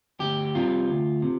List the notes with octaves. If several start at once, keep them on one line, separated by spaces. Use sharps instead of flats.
D2 G4
C3 G3 F4
D2
C3